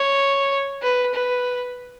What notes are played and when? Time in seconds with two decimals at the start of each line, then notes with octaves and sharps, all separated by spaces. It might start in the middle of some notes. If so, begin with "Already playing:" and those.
Already playing: C#5
0.83 B4
1.14 B4